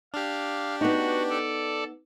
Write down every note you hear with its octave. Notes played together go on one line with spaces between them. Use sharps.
D4 G4 F5
B3 D#4 F#4
A4 D5